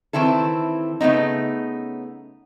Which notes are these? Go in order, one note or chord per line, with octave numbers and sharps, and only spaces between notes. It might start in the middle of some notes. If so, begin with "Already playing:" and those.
D#3 E3 C4 E4 A4
C#3 A3 B3 C4 D#4